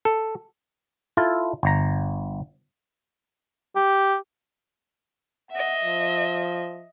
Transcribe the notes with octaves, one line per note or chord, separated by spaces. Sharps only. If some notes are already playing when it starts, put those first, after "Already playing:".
A4
E4 F4 A4
G1 A#5
G4
D#5 E5 F#5
F3